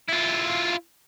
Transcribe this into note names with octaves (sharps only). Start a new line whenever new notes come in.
E4 F4